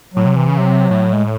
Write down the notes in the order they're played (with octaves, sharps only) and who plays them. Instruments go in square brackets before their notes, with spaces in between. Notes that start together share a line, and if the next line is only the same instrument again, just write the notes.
[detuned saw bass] A2 [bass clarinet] F#3
[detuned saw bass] C3
[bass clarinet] E3
[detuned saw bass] C#3
[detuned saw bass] C3 [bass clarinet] F#3
[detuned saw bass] A2
[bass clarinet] G#3